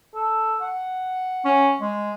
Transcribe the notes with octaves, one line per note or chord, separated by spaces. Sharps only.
A4
F#5
C#4
G#3